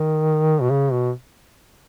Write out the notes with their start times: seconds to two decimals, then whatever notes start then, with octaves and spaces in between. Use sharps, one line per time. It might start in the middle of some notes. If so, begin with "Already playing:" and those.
Already playing: D#3
0.61 B2
0.70 C#3
0.92 B2